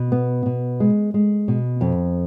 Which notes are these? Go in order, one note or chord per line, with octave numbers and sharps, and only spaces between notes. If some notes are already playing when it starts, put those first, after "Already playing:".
Already playing: B2
B3
B2
G#3
G#3
B2
F2